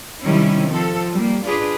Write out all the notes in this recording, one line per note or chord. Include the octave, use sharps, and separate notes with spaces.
C3 D#3 G3 C#4 E4
F3 C4 A4
G3 A#3
D4 F4 G#4 B4